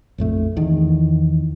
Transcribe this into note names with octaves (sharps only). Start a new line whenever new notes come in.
A#1 F2 A3
E2 D#3